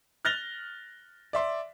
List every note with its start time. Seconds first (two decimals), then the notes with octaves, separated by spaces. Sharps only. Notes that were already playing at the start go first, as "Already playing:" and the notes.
0.25 F6 F#6 A6 A#6 F7 G7
1.33 D5 E5 C6